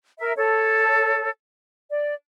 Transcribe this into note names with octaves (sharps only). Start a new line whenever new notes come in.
A#4 E5
A4 C#5
D5